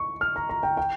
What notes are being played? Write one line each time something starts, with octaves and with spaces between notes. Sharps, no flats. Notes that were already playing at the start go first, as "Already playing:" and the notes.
Already playing: C#6
F6
A#5
A#5
G5
G5